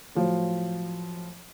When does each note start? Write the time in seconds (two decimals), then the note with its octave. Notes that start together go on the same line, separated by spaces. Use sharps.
0.15 A2 F3 F#3